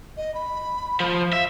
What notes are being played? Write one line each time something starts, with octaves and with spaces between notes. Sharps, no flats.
D#5
B5
F3
E5 F5